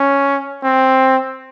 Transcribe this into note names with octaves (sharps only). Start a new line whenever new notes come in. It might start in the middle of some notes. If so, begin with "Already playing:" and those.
Already playing: C#4
C4